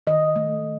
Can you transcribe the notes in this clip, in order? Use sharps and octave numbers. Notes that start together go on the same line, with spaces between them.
D#3 D#5
A3